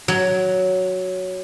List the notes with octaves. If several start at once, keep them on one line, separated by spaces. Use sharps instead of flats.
F#3